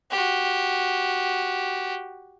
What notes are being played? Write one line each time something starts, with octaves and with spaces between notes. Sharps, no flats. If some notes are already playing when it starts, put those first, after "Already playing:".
F#4 G4